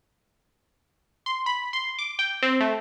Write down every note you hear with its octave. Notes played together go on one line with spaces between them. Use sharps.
C6
B5
C6
D6
G5
C4
A3